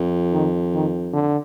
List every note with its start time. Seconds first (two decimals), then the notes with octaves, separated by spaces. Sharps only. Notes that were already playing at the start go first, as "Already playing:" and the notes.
Already playing: F2
0.33 D#3
0.74 D#3
1.13 D3